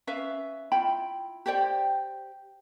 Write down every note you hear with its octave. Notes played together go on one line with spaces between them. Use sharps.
C#4 B4 E5 F5
E4 F4 G5 B5
G4 C5 D5 G5